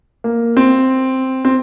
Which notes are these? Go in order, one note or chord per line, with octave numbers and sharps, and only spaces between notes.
A#3
C4
C4